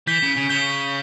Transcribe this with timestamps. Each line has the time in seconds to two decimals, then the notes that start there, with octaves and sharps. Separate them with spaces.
0.07 E3 G6 B6 G7
0.22 C#3
0.36 C#3
0.49 C#3 G6 B6 G7